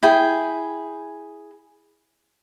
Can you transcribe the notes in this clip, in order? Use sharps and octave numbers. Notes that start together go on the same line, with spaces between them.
E4 G#4 G5